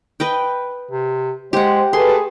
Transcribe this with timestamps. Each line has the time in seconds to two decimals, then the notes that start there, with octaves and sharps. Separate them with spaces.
0.20 B4 D#5 G5
0.91 C3
1.53 G#3 G4 C5 F#5
1.93 A3 G4 G#4 B4 C6